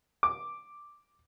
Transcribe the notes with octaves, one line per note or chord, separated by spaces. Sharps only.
D6